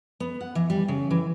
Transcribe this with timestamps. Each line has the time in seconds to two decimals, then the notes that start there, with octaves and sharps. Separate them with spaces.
0.20 B3
0.41 F#5
0.55 E3
0.70 G3
0.88 C#3
1.11 E3